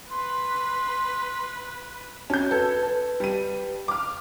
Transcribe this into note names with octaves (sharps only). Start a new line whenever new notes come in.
B4 C6
C#4 F#4 A5 G6
A4 B4 A5 G#6
B4 A5
G3 D#7
D6 F6